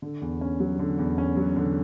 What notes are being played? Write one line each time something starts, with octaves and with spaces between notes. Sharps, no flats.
D3
E2
C#4
F#3
D3
E2
C#4
F#3
D3